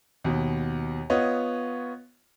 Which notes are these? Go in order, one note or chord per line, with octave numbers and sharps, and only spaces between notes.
D#2 B2
B3 F4 C#5 D#5